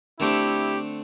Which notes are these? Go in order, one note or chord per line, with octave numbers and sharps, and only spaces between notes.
D3 A3 C4 E4 G4